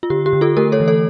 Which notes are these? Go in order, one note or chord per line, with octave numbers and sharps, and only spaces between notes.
F4
D3 G4
G4
D3
F4 A4
A3 G4 A#4
A4 C#5
E3
A4 C#5